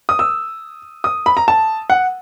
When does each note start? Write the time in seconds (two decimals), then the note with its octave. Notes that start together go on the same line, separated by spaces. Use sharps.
0.09 D#6
0.19 E6
1.04 D#6
1.26 B5
1.37 A#5
1.48 A5
1.90 F#5